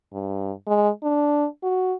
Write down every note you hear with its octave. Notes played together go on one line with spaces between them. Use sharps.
G2
G#3
D4
F#4